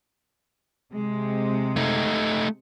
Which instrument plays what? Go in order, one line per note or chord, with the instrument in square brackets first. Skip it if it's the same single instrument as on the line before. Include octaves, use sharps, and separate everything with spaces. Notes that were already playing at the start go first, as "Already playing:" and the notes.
[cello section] C3 G#3
[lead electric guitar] A3 D#4